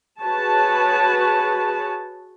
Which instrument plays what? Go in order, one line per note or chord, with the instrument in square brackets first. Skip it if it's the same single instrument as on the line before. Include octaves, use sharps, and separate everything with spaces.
[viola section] F#4 G#4 B4 C#5 A5